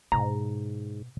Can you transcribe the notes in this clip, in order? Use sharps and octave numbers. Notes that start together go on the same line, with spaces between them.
G#2 B2 A#5